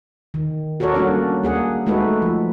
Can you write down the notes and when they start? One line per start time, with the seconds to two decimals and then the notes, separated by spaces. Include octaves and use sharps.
0.34 D#3
0.80 F#4 A4 A#4 C#5 D5
0.95 G3 A#3 C#4 D4 F#4
1.43 A#3 G#4 F#5
1.86 G#3 A3 D#4 F#4 A4 B4
2.22 F3